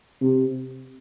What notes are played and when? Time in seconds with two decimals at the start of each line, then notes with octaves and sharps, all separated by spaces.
0.21 C3